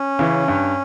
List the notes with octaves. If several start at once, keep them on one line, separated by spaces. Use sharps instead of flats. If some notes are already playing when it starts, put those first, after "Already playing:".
Already playing: C#4
C#3 E3
G2